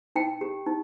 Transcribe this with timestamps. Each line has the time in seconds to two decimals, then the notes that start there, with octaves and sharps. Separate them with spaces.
0.16 D#4 G5
0.41 G4
0.66 D#4